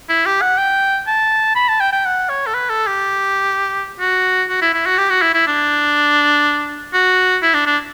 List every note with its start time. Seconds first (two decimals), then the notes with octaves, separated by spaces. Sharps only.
0.09 E4
0.26 G4
0.41 F#5
0.58 G5
1.07 A5
1.55 B5
1.68 A5
1.80 G5
1.93 G5
2.05 F#5
2.29 C#5
2.47 A4
2.54 B4
2.69 A4
2.87 G4
4.00 F#4
4.49 F#4
4.62 E4
4.73 E4
4.86 F#4
4.98 G4
5.10 F#4
5.22 E4
5.34 E4
5.47 D4
6.93 F#4
7.42 E4
7.54 D4
7.66 D4